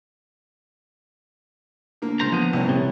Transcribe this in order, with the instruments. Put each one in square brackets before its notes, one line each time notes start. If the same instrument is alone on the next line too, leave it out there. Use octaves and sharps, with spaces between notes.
[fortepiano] D3 A#3
[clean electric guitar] C#2 C5 A#5
F3 B3
[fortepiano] C2 C#4
[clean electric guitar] C3